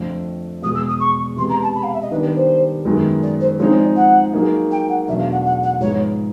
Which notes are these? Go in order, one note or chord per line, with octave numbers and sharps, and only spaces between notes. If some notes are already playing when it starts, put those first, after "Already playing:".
Already playing: F2 D3 F3 A3 C4
E2 B2 G#3 D#6
E6
D#6
C#6
C3 E3 G#3 B3 C6
A#5
A5
B5
F5
E5
D#5
D#3 G3 B3 D4 G4 B4
B4
C5
F#2 D#3 G#3 B3
D5
C5
F3 G#3 C4 D#4 G#4 C#5
D5
F#5
F#3 A#3 D#4 G#4
G5
F#5
E2 B2 F#3 A3 D4 E5
F5
F#5
F#5
F#5
G#2 F3 G#3 B3 E4 C#5